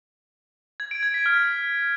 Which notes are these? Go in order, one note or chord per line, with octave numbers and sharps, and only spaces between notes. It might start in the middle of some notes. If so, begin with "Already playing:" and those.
G#6
D7
G#6
B6
F6